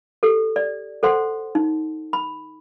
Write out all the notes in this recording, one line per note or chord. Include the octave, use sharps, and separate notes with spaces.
G4 A4
D5
A4 C5 F#5 C6
D#4
B5